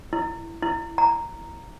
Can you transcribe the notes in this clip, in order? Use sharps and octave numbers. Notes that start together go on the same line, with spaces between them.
E4
E4
A#5